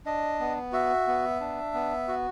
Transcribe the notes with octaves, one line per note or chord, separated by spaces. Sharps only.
D4 D#5
B3
F#4 E5
B3
D4
B3
F#4